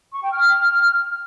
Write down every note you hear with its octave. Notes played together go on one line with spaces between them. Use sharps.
C#6
G5
F6